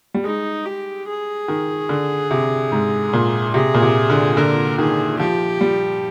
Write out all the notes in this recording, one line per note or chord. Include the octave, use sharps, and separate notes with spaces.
G3
G#3 D#4
G4
G#4
D#3
D3
C3
G#2
A#2
C3 G#4
A#2
C3
D3
D3 A#4
D#3 G#4
F3 G4
G3